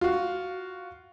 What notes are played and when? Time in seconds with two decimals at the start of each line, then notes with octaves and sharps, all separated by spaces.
0.01 F4 F#4